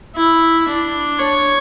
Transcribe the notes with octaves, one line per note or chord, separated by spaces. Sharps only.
E4
D4
C#5